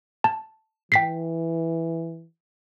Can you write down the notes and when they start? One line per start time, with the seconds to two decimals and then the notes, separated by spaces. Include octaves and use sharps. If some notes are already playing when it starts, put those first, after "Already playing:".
0.24 A5
0.92 E3 G5 B6 C7